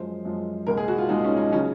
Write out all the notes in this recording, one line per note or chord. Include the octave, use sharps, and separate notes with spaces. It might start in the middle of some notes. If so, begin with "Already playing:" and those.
Already playing: F#2 F3 G#3 C5
F#2 F3 G#3
C2 A#2 G#3 A#4
G#4
F#4
F4
C2 A#2 G#3 D#4
C#4
D#4
C#3 F#3 C#4